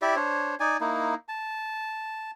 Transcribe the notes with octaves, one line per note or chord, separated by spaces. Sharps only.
E4 G4 D5 E5
D4 C5 C#5
D#4 D5 G#5
A#3 D#4 E4
A5